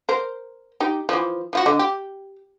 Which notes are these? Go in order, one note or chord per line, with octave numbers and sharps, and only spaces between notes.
A#4 C5
D#4 G4
E3 F3
F3 F4 F#4
D3 D#5
G4